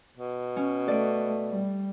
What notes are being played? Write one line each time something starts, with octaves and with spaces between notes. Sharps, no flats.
B2
C#4
A3 D5 D7
G3